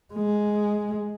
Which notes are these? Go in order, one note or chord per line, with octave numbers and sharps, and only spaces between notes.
G#3